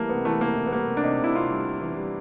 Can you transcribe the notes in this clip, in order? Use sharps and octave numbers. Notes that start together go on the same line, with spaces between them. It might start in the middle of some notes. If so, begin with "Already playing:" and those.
Already playing: E3 G3 A3 A#3
C3 B3
E3 A3
C3 A#3
E3
B3
G3 A#3
C3
D4
C3 D#4
C3 E4
C3 F4
G3
G3
E3
G3